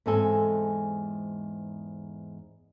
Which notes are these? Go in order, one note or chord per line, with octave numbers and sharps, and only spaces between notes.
E2 G#2 G#3 C4 A4 G#5